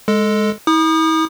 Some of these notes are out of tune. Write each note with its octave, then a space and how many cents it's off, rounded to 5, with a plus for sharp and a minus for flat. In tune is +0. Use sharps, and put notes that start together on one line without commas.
G#3 +0 A4 +0
E4 -45 D#6 -30